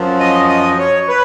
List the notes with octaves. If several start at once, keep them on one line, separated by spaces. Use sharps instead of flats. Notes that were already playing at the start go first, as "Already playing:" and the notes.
Already playing: F#2 F3
D#5
D#5
C#5
B4